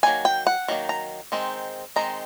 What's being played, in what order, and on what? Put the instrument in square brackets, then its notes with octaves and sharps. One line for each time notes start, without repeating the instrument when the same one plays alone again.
[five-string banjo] D#3 F#3 A#3 D#4 G#5
G5
F#5
D#3 F#3 A#3 D#4
A#5
D#3 G#3 C4 D#4
D#3 G#3 C4 D#4 A#5